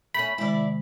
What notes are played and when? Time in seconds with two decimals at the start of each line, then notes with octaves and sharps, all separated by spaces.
0.14 A3 C#4 B5
0.38 C3 D#3 G#3 E4 D5